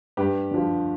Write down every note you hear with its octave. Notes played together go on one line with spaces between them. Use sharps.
G2 G4 B4
D3 F3